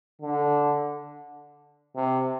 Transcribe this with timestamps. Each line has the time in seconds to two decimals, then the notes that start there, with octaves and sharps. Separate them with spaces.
0.22 D3
1.96 C3